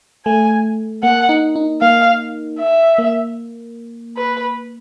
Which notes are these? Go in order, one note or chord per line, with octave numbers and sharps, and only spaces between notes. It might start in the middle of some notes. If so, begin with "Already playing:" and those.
A3 G#5
A#3 F#5
D#4
D#4
A#3 F5
E5
A#3
B4